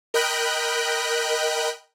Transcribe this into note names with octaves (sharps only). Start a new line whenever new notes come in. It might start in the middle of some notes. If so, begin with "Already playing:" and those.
A#4 D#5 G5 B5 F#6